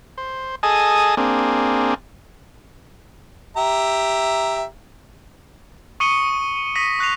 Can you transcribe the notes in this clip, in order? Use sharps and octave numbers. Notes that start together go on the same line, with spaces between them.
C5
G#4 A4 D#5 G#5 A5 D#6
A#3 C4 D4 G#4
G4 E5 A#5
C#6 D#6 C#7 D#7 G7
C#6 D#6 A#6 B6 D#7
C#6 F#6 A#6 C7 F7